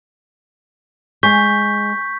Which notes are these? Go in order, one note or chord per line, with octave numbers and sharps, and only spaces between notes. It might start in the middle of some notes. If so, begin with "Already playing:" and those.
G#3 C#6 G6 B6